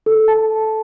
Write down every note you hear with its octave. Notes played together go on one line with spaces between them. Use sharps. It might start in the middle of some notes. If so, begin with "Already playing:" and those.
A4
A5